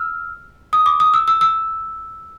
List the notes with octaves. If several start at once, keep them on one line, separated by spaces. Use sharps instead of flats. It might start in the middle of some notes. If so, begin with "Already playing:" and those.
Already playing: E6 F6
D#6
D6
D#6
E6
E6
E6